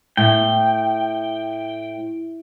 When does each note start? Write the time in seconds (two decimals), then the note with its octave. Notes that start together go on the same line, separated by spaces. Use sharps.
0.17 A2 G5